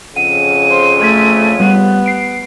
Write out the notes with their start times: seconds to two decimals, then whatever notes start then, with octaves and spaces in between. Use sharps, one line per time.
0.16 F2 C#3 F#5 D#7
0.70 C5
1.00 A3 C6 G#6 B6
1.60 G3 B3 G4
2.06 C7 D7